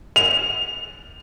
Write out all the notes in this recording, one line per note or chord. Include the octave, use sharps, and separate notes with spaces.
F7